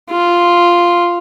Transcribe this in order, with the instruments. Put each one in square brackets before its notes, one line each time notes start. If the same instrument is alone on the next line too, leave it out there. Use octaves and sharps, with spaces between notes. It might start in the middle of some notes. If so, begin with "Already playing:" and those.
[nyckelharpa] F4